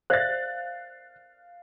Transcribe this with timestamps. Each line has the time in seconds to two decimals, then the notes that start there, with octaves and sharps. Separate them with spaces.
0.10 C5 D5 E5 F5 F#6 A6